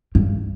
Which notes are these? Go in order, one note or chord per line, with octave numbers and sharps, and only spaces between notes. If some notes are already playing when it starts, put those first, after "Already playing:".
G2